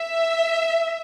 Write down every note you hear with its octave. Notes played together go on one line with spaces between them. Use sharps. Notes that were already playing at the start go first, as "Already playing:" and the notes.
Already playing: E5